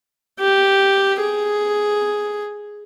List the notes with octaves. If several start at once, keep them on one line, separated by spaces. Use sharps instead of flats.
G4
G#4